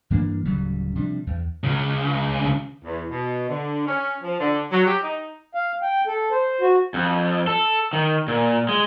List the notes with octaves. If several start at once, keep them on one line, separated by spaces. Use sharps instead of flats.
G2 E3 A#3 D4
D1 C#3 F#3 G3
C3 F3 G3 D4
E2
C#2 C#3
E2
B2
D3
C#4
F3
D3
F#3
G4
D#4
F5
G5
A4
C5
F#4
F2
A4
D#3
A#2
G#3